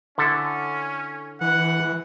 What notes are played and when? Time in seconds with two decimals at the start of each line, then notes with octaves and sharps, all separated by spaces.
0.18 D3 C#4 E4 A4
1.41 E3 F#5